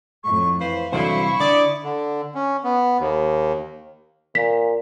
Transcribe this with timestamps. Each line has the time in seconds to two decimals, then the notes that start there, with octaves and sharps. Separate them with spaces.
0.24 F2 A2 C#6
0.60 E3 B4 C5 F5
0.92 C2 D3 E3 F#3 E4 C5 C#6
1.40 D3 D5 D#6
1.83 D3
2.35 C#4
2.64 B3
3.00 D#2
4.35 A#2 B6